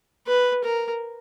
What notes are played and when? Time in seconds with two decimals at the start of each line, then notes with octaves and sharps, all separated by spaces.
0.27 B4
0.64 A#4